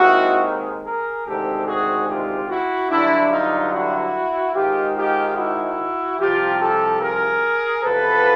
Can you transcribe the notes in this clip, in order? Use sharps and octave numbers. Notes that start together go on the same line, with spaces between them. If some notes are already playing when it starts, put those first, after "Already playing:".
Already playing: D#2 D#3 G#3 C4 E4 F#4
G#4 A#4
D2 C3 D#3 G#3 C4 G4 A4
F#4 G#4
F4 G4
E4 F#4
G2 D3 F#3 D4 E4
D#4 F4
E4 F#4
G#2 D#3 G#3 F4 G4
F4 G4
E4 F#4
C2 C3 F3 F4 G4
G4 A4
G#4 A#4
E2 C3 F3 A4 B4